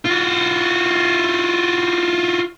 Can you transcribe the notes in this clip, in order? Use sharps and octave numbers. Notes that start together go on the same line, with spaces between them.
F4 F#4